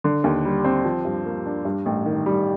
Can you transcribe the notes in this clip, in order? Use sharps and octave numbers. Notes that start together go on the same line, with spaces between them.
D3
D#2
G3
C4
F3
G2
A#3
D4
G2
A1
D#3
G3